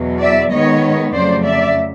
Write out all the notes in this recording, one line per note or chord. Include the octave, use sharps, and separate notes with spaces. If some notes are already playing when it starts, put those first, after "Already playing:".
Already playing: E2 B2 F#3
D5 E5
D#3 G#3 B3 C#5 D#5
F2 C#3 F#3 A3 C5 D5
D5 E5